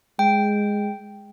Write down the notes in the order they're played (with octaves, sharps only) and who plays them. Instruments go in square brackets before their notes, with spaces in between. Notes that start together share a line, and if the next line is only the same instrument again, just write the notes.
[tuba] G#3 [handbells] G5